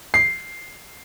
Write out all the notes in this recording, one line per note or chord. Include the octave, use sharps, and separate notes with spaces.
C7